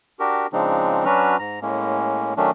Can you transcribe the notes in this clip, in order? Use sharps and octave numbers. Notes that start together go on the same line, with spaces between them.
D4 F#4 G4 A#4
C#3 F3 G#3 C4 D4 D#4
F#3 C#4 D4 F#4 B4 F6
G#2 A#5
A2 G#3 A#3 C#4
D#3 F#3 A3 C#4 D4